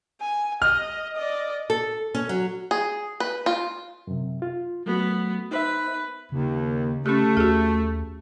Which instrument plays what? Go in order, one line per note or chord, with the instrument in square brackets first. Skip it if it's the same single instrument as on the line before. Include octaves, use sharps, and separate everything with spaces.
[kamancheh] G#5
[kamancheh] D#5 [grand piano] F6
[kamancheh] D5 D#5
[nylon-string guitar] A4
C#4
F#3
[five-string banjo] G#4
B4
F4
[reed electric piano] F#2 C3
F4
[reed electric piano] F#3 A3 F#4 [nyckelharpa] B3
[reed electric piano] D#4 C5 E5 [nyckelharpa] B4
[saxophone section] D#2 [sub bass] C#3
[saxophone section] A3 [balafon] C#4 G4
[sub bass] D#2 [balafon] F#4 G#4